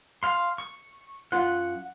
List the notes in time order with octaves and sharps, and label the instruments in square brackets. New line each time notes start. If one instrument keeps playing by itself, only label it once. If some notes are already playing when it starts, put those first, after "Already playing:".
[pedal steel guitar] F5 C6
C#6
[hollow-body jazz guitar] F#2 F4 C6 [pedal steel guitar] F#5